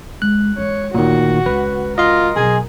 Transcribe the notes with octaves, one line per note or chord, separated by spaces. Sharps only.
G#3 F#6
E3 G#3 C#5
D2 A#2 D#3 F#4
C#2 B4
F4 A#4 D#5 C6
B2 F#3 G#4